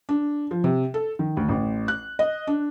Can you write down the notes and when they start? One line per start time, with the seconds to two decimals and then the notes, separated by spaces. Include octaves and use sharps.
0.09 D4
0.51 F3
0.64 C3
0.94 A4
1.19 D#3
1.37 D2
1.49 A1
1.88 F#6
2.19 D#5
2.47 D4